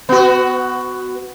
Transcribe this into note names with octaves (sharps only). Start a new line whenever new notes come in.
B3 F#4